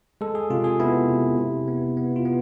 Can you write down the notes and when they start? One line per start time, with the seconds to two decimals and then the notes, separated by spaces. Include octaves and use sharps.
0.21 G#3 A4
0.35 G#4
0.50 C3 F4
0.64 G#4
0.80 B3 E4
1.09 C3
1.38 C3
1.68 B3
1.97 B3
2.16 F4
2.25 B3